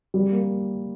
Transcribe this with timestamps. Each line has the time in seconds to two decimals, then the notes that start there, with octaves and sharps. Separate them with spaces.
0.14 G3
0.32 A#3